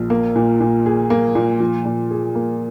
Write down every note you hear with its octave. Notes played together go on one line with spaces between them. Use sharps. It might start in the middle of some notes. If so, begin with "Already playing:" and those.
Already playing: A#1
A#3
A#2
A#2
G#4
A#3
A#2
F3
A#2
G#4
A#3